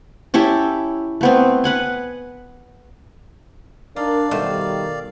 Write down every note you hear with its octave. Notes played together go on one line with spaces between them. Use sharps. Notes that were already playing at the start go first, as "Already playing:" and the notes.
C#4 E4 G4 A4
A3 B3 C4
B4 F#5 G#5
D4 D#4 A#4 D5 F5
B2 D#3 G3 A3 C5